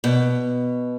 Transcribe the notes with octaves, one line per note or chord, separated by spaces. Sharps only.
B2